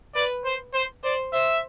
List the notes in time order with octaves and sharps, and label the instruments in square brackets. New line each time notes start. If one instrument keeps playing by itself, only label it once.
[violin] B4 [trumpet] D5
[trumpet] C5
C5
[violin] C5 [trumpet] D5
[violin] C5 [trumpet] E5